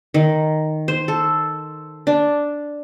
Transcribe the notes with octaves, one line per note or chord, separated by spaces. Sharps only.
D#3
C5
A4
D4